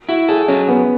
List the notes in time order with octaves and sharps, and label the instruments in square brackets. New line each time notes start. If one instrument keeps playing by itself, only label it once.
[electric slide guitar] E4 [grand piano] F#4
[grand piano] G#4 [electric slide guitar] A4
[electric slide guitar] F#3 [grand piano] C#4
[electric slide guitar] F#2 [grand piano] B3